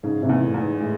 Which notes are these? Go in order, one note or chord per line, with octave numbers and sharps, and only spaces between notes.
G#2 C#3
G#2 C3
E2
A2
E2
G#2
A2 G#3